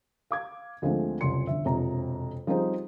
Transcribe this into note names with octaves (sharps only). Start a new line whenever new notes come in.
F5 D6 G#6
D2 F3 G#3 A3 C4
F#1 C2 F2 C6 C#7
G1 E5
E1 F2 C3 A#5
F3 G3 C4 D#4 G#4 C5